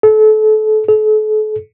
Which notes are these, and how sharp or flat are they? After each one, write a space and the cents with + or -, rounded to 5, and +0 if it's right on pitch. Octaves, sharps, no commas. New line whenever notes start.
A4 -30
A4 -40